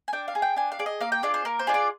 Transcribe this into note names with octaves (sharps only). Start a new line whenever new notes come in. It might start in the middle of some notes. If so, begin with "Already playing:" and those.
G#5
D4 G5
F5
G#4
G5
D4 G#5
F5
G#4 D5
D#5
A#3 F5
G5
D4 F4 G#4 D5
C5
A#3 A#4
C5
D4 F4 G#4
D5